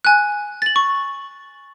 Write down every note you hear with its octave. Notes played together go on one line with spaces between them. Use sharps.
G#5 F#6
A6 F#7
C#6